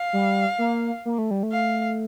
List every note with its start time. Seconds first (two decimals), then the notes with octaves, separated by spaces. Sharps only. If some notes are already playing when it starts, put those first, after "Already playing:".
Already playing: F5
0.13 G3
0.59 A#3
1.05 A#3
1.18 A3
1.31 G3
1.43 A3
1.52 F5